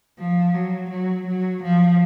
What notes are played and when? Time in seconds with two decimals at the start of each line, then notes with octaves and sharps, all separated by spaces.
0.19 F3
0.54 F#3
0.90 F#3
1.27 F#3
1.63 F3